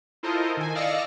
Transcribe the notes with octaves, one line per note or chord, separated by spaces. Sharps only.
E4 F4 A4 A#4 C5 D#5
D#3 G#5
D5 D#5 F5 E6 A#6 C#7